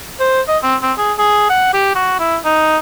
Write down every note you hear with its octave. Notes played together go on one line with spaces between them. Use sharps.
C5
D#5
C4
C4
G#4
G#4
F#5
G4
F#4
E4
D#4